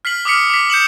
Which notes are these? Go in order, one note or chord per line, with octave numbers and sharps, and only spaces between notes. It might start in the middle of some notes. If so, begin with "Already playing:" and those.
F6 B6 C7 F#7
D6 D#6 F6 B6 C#7
D6 B6
G6 C#7 E7 F#7